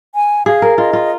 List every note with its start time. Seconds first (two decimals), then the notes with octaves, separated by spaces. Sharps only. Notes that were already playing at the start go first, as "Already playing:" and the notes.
0.15 G#5
0.46 G#4 F5
0.62 A#4
0.78 F4 D#5
0.93 F4